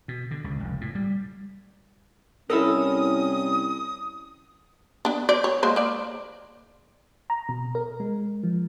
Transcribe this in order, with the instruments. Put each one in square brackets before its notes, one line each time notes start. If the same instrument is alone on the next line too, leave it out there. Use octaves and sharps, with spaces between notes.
[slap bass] B2
D3
C#2
F1
A2
G3
[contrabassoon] C2 [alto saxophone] C#4 [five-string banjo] E4 A4 A#4 [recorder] D#6
[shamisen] B3 D4
C5 D5
C#5
G#3 A#3 C5
A#3 D5
[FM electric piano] A#5
B2
A#4
G#3
F3